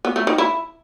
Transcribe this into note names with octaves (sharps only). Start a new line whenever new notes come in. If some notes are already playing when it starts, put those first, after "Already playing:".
B3
A3
D#3
E4